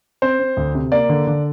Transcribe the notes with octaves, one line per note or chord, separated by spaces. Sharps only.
C4 C5
C4
D2
C3
A#3 D5
D3
D3